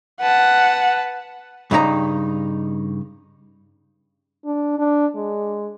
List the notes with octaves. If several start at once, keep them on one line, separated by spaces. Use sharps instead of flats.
B4 F#5 A5
G2 C#3 D#4 B4 A#5
D4
D4
G#3